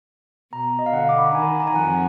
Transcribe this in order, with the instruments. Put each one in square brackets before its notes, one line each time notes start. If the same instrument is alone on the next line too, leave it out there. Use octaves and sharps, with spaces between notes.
[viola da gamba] B2 [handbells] A#5
[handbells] D#5
F5
[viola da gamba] D3 [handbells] F#5
[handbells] D6
B5
A#5
[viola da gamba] D#3 [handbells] G#5
[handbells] A#5
G#5
[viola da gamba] F2 F3 [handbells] F#5